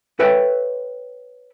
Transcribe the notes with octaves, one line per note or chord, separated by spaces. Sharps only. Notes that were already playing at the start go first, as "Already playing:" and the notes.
A4 B4 C#5 E5 G5